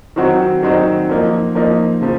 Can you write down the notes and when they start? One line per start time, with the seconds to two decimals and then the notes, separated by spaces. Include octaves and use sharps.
0.16 D#3 F#3 C4 D#4 F#4
0.63 D#3 F#3 C4 D#4 F#4
1.09 F3 A#3 D#4
1.55 F3 A#3 D#4
2.01 C#3 F3